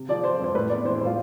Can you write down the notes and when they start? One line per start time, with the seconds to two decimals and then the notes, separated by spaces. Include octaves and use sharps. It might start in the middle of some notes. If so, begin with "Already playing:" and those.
Already playing: C3
0.09 F3 D5
0.24 F3 C5
0.39 F2 C5
0.54 A2 B4
0.70 B3 D5
0.85 E3 C5
0.95 C5
1.00 A2
1.05 F4